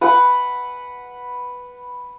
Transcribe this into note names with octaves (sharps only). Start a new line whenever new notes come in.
B4 F#5 B5